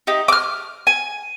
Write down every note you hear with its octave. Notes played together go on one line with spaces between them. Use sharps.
D#4 G4
D6 F6
G#5